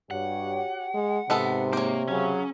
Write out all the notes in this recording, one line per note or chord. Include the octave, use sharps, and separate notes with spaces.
G2 F#4 G4 C#5 F#5
G#3
G#2 C3 G#3 B3 A4
A#3 C5 C#5
C#3 F#3 C#4